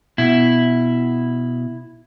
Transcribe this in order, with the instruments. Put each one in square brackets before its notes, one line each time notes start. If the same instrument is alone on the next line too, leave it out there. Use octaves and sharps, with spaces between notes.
[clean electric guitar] B2 [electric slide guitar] E4